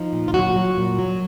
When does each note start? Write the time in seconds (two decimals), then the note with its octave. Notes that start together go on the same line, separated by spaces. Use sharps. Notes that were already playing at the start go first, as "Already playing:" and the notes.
Already playing: F3 D#4
0.13 A#2
0.28 F4
0.34 F#3 F#4
0.56 F#3
0.78 A#2
0.99 F#3